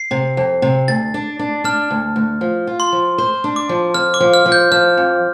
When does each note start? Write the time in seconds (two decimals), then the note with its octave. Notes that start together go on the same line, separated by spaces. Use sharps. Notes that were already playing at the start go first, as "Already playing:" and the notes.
Already playing: C7
0.11 C3
0.37 F2
0.62 C3
0.88 D2 A6
1.14 D4
1.39 D4
1.64 D4 F6
1.91 D2
2.16 D2
2.41 F3
2.67 F4
2.80 C6
2.92 F3
3.18 C5
3.44 D4
3.56 D6
3.69 F3
3.94 F2 F6
4.14 D6
4.20 F3
4.34 F6
4.46 F3
4.52 G6
4.71 F3 F6
4.97 F2